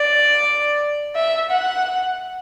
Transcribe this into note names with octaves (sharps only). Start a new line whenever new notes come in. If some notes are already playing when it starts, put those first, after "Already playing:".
Already playing: D5
E5
F#5